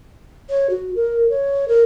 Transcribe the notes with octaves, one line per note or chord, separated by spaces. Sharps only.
C#5
F#4
A#4
C#5
A#4